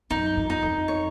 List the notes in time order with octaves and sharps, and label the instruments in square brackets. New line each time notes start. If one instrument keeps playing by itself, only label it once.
[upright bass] F#2 [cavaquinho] D#4
[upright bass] F2
[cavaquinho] D#4
[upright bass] F2
[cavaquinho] C#5